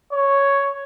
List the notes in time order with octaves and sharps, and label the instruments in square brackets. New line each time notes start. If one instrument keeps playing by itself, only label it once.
[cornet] C#5